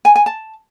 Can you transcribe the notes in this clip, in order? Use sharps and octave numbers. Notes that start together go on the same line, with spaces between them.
G#5
G#5
A5